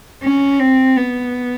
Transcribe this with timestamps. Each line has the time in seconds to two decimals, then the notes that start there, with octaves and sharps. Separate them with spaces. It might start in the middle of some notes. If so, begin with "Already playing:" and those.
0.24 C#4
0.60 C4
0.97 B3